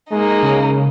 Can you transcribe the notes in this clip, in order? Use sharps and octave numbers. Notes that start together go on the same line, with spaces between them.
G#3 A#3 D#4
C#3